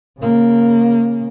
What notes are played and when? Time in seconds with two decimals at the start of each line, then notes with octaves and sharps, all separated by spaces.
0.19 C#3 A#3